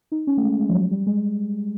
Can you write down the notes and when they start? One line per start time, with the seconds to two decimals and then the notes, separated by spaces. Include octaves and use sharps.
0.12 D#4
0.27 C#4
0.37 A3
0.43 G#3
0.59 G#3
0.69 F3
0.74 F#3
0.91 G3
1.06 G#3